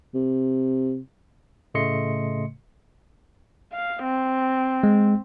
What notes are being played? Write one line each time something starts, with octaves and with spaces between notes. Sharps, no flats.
C3
A2 C#3 A3 D#5 C6 C#7
F5
C4
G#3